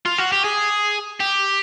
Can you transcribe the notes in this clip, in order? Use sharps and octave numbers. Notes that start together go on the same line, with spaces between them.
F4
F#4
G4
G#4
G4